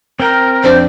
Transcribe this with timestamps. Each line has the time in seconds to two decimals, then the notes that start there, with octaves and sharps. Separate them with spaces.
0.20 C4 A#4 G5
0.64 F2 D4 C5 D5